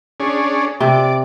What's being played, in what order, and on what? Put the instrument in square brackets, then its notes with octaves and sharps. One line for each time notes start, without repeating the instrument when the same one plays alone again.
[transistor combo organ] C#4 D4 G#4
[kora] C3 [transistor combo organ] D5